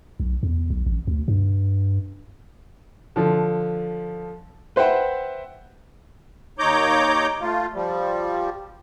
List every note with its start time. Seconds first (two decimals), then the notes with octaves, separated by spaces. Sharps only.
0.20 B1
0.43 E2
0.70 B1
0.86 A1
1.07 D2
1.28 G2
3.16 D3 F3
4.76 B4 C5 E5 F#5 G5
6.59 D#2 D#4 C#5 A#5 D6 G6
7.41 A3 F4
7.74 F3 G3